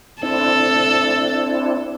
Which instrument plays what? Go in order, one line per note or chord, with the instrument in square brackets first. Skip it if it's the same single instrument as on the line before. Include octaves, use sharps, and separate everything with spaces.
[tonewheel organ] C4 D4 E4 [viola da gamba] A4